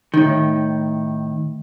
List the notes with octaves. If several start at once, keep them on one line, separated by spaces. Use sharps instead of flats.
A2 D#3